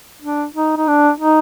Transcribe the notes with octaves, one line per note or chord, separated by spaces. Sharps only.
D4
D#4
D#4
D4
D#4